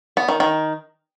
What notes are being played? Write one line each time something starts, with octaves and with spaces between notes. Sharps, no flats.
B3
D#3
D#3